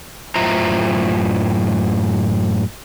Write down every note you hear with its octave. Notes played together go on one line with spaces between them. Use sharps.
F#2 A2 F4 C5 E5 A#5